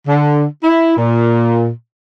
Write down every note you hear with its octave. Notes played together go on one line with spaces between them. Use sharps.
D3
E4
A#2